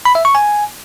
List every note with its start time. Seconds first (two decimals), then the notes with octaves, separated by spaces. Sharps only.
0.05 B5
0.15 E5
0.25 C#6
0.35 G#5